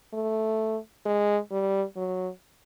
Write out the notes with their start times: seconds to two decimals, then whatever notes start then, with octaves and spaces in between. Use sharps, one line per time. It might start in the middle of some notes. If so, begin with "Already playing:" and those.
0.13 A3
1.06 G#3
1.51 G3
1.96 F#3